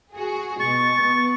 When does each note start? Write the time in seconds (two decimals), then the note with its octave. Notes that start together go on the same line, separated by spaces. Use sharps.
0.13 F#4 G#4
0.60 B2 C#6 A6
1.02 B3